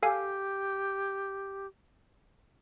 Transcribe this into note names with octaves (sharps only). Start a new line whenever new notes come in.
G4 A4 F5 G#5